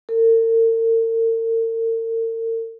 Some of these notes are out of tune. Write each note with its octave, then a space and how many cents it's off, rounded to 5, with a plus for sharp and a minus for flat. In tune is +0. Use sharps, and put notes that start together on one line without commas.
A#4 -45